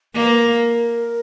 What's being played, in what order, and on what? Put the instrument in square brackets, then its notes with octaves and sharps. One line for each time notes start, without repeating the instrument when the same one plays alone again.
[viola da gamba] A#3 [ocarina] A#4
[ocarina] B4
A#4